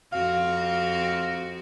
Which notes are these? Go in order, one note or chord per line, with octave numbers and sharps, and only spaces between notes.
F2 C4 F#4 F5